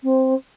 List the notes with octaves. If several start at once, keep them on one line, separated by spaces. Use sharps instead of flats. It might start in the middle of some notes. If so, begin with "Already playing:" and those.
C4